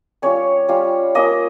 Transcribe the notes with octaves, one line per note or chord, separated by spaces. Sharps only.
G3 C#4 F4 C#5
G3 C#4 F4
A#3 C#4 F4 D#5